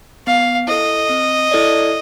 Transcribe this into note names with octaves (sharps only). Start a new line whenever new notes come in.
B3 F5
E4 A4 D#5
C4
E4 A4 D5